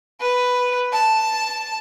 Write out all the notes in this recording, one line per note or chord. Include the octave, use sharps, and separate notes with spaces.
B4
A5